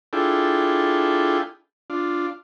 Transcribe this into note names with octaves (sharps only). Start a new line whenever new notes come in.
D4 E4 F4 G#4 A4 G5
D4 F4